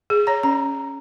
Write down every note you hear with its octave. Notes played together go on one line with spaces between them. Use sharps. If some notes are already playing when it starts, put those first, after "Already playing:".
G#4
C#5 A#5
C#4 A#5